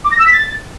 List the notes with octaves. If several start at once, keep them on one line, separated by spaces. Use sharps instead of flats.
D6
A#6
E6
B6
A6